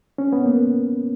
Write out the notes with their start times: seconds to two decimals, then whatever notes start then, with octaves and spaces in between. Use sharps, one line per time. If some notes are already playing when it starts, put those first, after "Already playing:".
0.18 C#4
0.33 B3
0.46 A#3